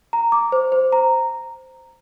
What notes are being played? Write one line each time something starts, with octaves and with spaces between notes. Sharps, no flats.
A#5
D6
C5
C5
A#5